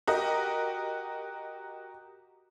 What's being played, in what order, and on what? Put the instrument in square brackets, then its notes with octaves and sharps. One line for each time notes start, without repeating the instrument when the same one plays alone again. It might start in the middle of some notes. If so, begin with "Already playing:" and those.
[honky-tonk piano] F#4 G4 A#4 D#5